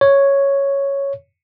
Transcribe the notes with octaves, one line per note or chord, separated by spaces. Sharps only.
C#5